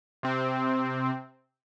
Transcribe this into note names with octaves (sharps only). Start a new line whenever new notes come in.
C3 C4